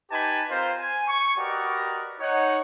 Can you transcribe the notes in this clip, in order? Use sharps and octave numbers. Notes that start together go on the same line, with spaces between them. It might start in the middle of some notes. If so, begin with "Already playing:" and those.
D#4 G4 B4 G#5 A5 B5
C4 F4 A#4 C5
G#5
C#6
F#4 G4 A#4 B4 D5 D#5
D#4 C#5 F#5